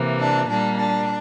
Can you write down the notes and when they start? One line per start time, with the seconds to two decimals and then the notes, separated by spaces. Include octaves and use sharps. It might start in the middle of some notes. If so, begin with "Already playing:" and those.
Already playing: C3 E3 A#3
0.19 D4
0.48 A#2 G3 A#3 D4
0.78 D4